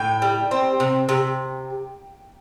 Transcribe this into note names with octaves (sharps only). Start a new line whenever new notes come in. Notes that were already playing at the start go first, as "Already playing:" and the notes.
Already playing: A2 G5
G3
C4
C3
C3